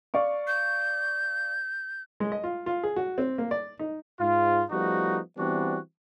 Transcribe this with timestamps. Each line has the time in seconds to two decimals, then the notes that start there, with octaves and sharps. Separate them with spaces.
0.14 D5 F5 C#6
0.47 G6
2.20 G#3
2.32 D#5
2.44 F4
2.66 F4
2.83 G#4
2.96 F#4
3.18 C4
3.38 A#3
3.51 D5
3.79 D#4
4.20 G#2 F4
4.71 F3 G3 A3 B3 D#4 F#4
5.38 E3 G3 B3 C4 D4 F#4